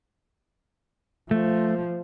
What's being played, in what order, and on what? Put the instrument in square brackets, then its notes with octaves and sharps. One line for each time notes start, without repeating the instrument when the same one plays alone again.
[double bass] F3 [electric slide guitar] A3